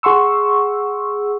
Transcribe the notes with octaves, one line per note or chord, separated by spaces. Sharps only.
G#4 F#5 C6 C#6 E6